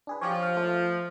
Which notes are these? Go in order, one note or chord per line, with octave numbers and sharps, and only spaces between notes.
D4 G#4 B4
F3 G4 C#5
F5
A3 F4